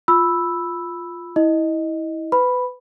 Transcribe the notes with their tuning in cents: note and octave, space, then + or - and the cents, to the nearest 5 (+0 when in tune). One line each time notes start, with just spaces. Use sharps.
F4 +0 B5 +0 E6 +0
E4 -25 D#5 +0
B4 +25 B5 +0